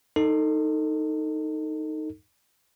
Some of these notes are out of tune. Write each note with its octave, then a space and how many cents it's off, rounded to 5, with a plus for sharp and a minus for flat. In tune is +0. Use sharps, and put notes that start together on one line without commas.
D#4 +0 A4 +25